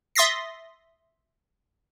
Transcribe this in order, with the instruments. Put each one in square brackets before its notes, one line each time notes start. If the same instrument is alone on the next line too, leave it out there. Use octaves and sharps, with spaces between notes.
[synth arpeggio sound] E5 C6 D#6 A6 A#6 C7